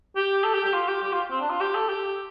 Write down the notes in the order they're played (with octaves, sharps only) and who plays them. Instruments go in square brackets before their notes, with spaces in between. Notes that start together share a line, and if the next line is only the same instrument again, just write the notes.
[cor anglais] G4
A4
G4
G4
F4
G4
G4
F4
C4
D4
F4
G4
A4
G4